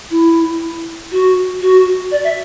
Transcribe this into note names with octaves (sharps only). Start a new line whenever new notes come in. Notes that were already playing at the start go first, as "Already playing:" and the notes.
E4
F#4
F#4
D5
E5